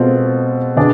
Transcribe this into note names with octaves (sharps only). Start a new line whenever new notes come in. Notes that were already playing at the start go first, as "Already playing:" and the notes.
Already playing: B2 G#3 C4 F4 A4
B2 B3 D4 G#4 D5